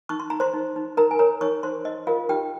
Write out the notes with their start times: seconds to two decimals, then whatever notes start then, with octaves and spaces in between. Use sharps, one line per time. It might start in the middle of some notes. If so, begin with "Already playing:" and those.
0.09 D#4 C#6
0.20 C6
0.30 D#4 A#5
0.40 C5 C6
0.54 D#4
0.76 D#4
0.97 D#4 A#4 A#5
1.11 G#5
1.19 A#4 C#5 A#5
1.41 D#4 C#5 C#6
1.63 D#4 C5 C6
1.85 D#4 D#5
2.07 F4 A#4 F5
2.29 D#4 G4 G5